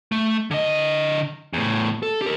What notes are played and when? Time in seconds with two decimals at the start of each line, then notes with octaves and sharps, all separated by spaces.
0.12 A3
0.51 D3 D#5
1.53 E2 A2
2.03 A4
2.22 G4 A#4